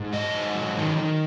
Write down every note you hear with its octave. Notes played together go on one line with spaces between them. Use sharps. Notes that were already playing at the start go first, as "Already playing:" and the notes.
Already playing: G#2
F#3 D#5
G#2
F#3
D#3
D#3